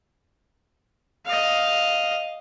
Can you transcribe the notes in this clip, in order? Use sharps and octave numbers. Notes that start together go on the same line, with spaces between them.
D#5 F5